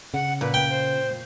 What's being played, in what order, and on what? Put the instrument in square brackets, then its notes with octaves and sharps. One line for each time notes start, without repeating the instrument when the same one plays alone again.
[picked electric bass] C#3 [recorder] F#5
[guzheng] A#2 [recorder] B4
[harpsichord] G5
[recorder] C5